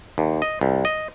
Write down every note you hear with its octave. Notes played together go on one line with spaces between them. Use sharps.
D#2
D#5
C2
D#5